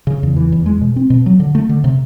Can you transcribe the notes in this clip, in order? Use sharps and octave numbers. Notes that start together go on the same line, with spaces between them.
C#3
E2
E3
E2
G#3
B2
C4
B2
F#3
D3
A3
D3
C3